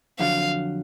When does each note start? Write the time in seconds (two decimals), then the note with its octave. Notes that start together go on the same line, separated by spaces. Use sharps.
0.19 F2 D3 F#3 F5